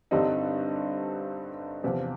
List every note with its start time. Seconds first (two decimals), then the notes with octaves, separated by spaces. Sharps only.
0.11 G2 D3 G3 C4 D#4
1.83 E2 C3 F3